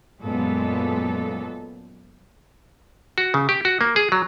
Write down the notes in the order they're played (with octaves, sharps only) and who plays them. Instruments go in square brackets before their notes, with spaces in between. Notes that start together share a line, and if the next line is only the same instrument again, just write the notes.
[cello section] F#2 A#2 G#3 B3 A4
[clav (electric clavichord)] F#4
C#3
G4
F#4
A#3
G#4
F#3